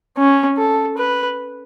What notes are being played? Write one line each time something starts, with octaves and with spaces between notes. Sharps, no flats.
C#4
A4
B4